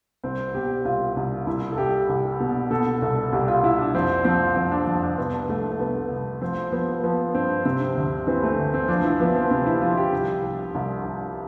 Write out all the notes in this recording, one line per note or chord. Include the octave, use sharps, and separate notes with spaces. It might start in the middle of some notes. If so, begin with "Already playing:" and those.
C2 C4
B2 G4
C2 F4
C2
C2 E4
A4
C2 G4
C2
B2
B2 A4
C2 A4
C2 G4
F4
C2 E4
D4
F2 C4
F3 C4
F2 C4
D4
F2 D4
D4
C2 B3
C2 A3
A3
C2 B3
C2
F3 C4
F3 B3
F3 B3
G2 C4
C3 C4
D2
E3 C4
A3
D2
C4
F3 D4
E4
F3 B3
C4
C3 C4
E4
F3 F4
G4
C2
C2
C2
C2